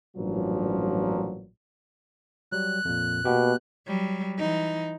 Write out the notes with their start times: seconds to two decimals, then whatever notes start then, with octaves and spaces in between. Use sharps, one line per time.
0.17 A1 G2 A#2 F3 F#3
2.52 F#3 G3 F#6
2.85 F2 A#2
3.25 B2 A#3 B3 G4
3.87 F#3 G3
4.38 E3 D#4